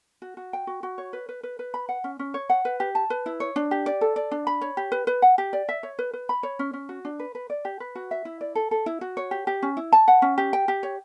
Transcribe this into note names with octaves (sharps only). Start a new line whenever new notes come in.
F#4
F#4
G5
F#4
F#4
C#5
B4
B4
B4
B4
B5
F#5
C#4
C#4
C#5
F#5
B4
G4
A5
B4
E4
C#5
D4
G4
D5
A4
D5
D4
B5
C#5
G4
B4
B4
F#5
G4
D5
E5
C#5
B4
B4
B5
C#5
C#4
C#4
F#4
D4
B4
B4
D5
G4
B4
F#4
E5
E4
D5
A4
A4
E4
F#4
C#5
G4
G4
C#4
E4
A5
F#5
C#4
G4
G5
G4
C#5